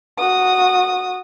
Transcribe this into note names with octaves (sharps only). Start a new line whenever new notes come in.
F#4 D#6